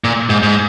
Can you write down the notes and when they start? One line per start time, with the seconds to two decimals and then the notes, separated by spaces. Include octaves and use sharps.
0.04 A#2
0.29 G#2
0.43 G#2